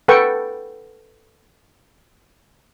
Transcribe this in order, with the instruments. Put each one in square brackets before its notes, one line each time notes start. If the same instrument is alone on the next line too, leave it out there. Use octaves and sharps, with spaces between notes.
[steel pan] A4 B4 F#5 G5 C#6